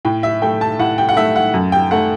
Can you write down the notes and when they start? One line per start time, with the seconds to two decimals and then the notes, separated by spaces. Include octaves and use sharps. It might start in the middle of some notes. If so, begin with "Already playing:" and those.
0.05 A2 G5
0.23 E5
0.42 A3 G5
0.61 A5
0.79 A2 F#5
0.98 G5
1.09 F#5
1.17 A3 E5
1.36 F#5
1.54 F#2
1.72 G5
1.91 A3 F#5